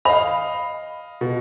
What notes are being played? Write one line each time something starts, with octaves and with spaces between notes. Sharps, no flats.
D#5 F5 B5
B2